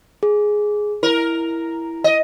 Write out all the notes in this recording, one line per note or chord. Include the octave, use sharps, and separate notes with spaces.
G#4
E4 A#4
D#5